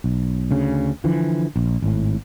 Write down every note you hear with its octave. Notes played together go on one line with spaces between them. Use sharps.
B1
D2 C#3
D3 E3 F3
A#1
G#1 A2